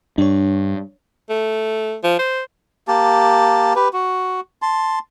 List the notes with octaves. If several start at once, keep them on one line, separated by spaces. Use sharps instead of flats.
G2 D4 C#5
A3
F3
C5
A#3 G4 A5
G4 B4
F#4
A5 C6